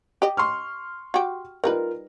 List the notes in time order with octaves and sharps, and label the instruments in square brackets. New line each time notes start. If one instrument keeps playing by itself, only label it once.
[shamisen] G4 D#5
[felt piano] C6 C#6 F6
[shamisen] F#4 G4
[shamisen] G3 D#4 B4 [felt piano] F4 A#4